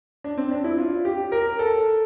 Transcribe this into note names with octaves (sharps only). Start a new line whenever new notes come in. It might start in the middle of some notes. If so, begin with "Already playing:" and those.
D4
C4
D4
E4
F4
G4
A#4
A4